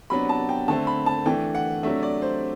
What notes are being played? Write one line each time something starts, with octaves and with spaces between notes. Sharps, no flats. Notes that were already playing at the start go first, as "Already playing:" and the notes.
C3 F#3 B3 D4 B5
A5
G5
D3 A3 C4 A5
B5
A5
E3 A3 D4 G5
F#5
C3 F#3 A3 D4 E5
D5
C5